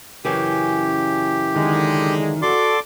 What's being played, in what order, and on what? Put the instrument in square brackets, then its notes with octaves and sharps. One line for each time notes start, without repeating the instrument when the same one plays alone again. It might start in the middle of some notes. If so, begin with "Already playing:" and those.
[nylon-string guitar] F#2 C#3 E3 [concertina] G4
[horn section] D3 G#3 [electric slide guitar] D#3
[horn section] F#4 A4 [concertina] D5 C6 D6